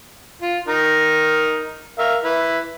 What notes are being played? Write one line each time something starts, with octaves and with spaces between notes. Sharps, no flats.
F4
D#4 A#4
A#4 E5 F5
E4 B4